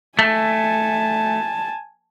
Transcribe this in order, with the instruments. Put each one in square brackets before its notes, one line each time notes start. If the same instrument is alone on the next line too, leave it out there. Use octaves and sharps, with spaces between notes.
[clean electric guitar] A3 [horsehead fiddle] G#5 A5